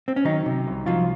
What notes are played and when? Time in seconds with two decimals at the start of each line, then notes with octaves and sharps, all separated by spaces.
0.08 C4
0.16 C#4
0.25 D#3 F#3 D#4
0.46 C3
0.67 C2
0.86 F3 F#3 F4